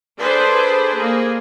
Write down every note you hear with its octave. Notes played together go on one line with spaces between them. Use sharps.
D4 G#4 A4 B4 C5
A#3 G#4